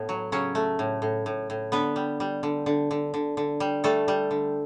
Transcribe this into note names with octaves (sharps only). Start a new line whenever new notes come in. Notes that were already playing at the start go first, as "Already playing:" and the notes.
Already playing: A2 B3
F#3
C#3 F#3 C#4
A3
A2
A2
A2
A2
D3 B3 B4
G3
G3
D3
D3
D3
D3
D3
G3
G3 A3 A4
G3
D3